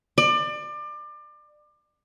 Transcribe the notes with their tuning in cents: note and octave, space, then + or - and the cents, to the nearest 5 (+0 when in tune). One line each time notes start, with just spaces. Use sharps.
D5 +30